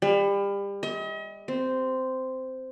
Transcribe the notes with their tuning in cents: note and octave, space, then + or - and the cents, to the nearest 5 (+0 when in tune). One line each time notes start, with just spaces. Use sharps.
G3 +30
D#5 +40
C4 -10